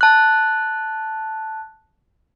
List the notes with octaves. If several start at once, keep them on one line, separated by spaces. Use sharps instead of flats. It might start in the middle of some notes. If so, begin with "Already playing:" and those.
A5 F#6